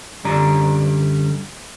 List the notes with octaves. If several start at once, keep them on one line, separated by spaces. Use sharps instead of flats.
F#2 D3 G3 D5 A#5